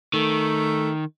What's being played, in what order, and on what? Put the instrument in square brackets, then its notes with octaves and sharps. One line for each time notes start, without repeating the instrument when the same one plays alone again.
[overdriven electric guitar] D#3 [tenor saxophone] A3